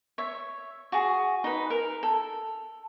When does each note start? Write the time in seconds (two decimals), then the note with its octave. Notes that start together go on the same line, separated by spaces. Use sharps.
0.18 C#5 E5
0.92 F#4 G#4
1.44 D#4 B4
1.70 A#4
2.03 A4